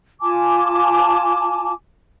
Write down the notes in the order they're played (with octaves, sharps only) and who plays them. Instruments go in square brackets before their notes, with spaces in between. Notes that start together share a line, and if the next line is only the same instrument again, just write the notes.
[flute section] F4 G#5 A5 D6